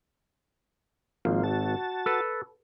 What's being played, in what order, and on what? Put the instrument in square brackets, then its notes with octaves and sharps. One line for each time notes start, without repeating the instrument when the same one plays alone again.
[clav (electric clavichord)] G#1 [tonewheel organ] F3 A#3 F4
[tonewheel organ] F#4 A5
[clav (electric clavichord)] A4 B4